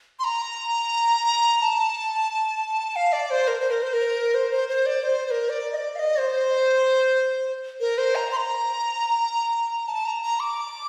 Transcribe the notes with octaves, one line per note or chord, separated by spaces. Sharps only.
C6
A#5
A#5
A5
F5
D5
C5
A#4
C5
A#4
C5
A#4
C5
C5
C5
D5
C5
C5
A#4
D5
D#5
D5
F5
D#5
C5
A#4
C5
A#5
C6
A#5
A5
A#5
A#5
D6